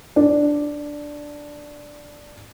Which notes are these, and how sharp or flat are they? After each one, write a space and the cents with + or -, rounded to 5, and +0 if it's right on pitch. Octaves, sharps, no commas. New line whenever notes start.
D4 +0